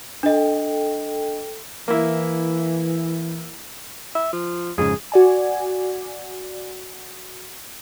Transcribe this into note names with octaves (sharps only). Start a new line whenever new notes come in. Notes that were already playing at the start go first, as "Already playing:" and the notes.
D4 A4 D#5 G5
E3 A#3 E4
E5
F3
F2 G#2 C#3 G#4
F#4 D5 G#5